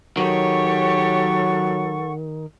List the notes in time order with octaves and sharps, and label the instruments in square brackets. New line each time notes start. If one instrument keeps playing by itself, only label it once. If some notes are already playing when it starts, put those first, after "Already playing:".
[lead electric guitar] D#3 [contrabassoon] F#3 [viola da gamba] G4 C#5 [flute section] A4 F#5 C#6